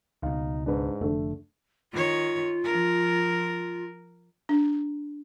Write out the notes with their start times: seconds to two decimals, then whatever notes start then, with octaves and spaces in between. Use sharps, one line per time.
0.23 C#2 B2 D#4 F5
0.66 G#2 D4 B4
1.01 F1 D3 A3
1.93 D#3 F4 C#5
2.64 F3 A#4
4.49 D4